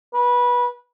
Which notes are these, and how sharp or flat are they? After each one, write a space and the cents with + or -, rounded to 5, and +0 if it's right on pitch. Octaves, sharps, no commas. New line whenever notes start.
B4 -20